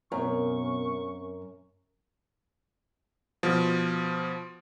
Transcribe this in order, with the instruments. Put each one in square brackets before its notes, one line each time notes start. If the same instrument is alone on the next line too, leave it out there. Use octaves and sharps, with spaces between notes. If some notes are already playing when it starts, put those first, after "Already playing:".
[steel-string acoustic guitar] F#2 [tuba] B2 [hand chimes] C4 A#4 C#5 [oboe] C#6
[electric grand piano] B2 F3